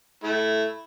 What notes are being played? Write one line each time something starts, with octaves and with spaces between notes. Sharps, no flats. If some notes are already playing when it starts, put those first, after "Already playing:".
A3 E4